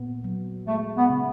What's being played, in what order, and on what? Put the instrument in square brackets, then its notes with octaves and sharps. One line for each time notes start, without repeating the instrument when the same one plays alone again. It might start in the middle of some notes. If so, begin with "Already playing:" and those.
Already playing: [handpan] A#2 B3
F#3
[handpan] G#3 [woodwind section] A3
[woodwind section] B3
[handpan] C#3